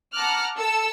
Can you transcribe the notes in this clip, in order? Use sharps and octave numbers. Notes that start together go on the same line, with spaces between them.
F#5 A5 A#5 D6 F6 F#6
A4 E6